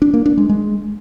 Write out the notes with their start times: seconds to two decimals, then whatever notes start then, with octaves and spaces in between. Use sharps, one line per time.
0.02 D4
0.14 A#3
0.26 D4
0.38 G#3
0.49 G#3